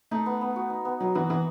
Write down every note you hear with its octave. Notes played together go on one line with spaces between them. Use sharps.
A3 D#4
B3
B3
F#4
D#4
B3
F#3 D#4
E3 B3
E3 B3